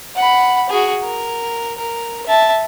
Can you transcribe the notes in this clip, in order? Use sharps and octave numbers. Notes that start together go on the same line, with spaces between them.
F#5 B5
F#4 G#4
A#4
A#4
E5 A5